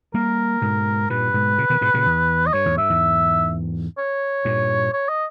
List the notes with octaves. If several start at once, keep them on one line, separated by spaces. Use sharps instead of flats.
G3 A#3 A#4
G#2 B2
G2 A#2 B4
G#2 B2
A#2 C#3
B2 D#3
G#2 B2
A#2 C#3
E2
D#5
G2 C#5
E2 G#2
G2 E5
E2 G#2
C#5
G2 A#2
C#5
D#5